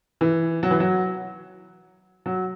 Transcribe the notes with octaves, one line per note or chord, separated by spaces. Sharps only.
E3
F#3
E3
F#3
F#3